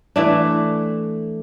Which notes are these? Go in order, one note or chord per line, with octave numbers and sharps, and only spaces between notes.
E3 A3 D4